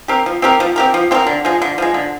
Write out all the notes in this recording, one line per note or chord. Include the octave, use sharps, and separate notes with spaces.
C4 G4 A#4
F3
C4 G4 A#4
F3
C4 G4 A#4
F3
C4 G4 A#4
D3
F3 G#3
D3
F3 G#3
D3